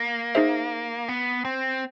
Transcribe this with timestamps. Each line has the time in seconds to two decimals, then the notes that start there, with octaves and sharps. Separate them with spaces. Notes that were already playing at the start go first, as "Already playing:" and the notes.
Already playing: A#3
0.35 D#4 G#4 C5 E5
1.08 B3
1.45 C4